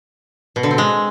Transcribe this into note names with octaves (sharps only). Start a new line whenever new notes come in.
B2
D3
C4
G#3